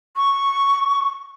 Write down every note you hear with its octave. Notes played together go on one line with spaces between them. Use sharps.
C#6